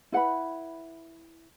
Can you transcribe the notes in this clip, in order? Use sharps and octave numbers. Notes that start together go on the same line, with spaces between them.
E4 B4 F#5 B5